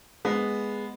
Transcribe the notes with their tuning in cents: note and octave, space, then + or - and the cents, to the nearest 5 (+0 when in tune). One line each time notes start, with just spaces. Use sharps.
G#3 +0 B3 +0